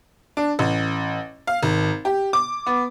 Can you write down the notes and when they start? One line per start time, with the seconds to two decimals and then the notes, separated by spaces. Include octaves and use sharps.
0.37 D4
0.59 A1
1.47 F5
1.63 G#1
2.05 G4
2.33 D6
2.66 B3